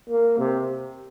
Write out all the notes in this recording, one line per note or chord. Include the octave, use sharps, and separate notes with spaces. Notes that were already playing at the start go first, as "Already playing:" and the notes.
A#3
C3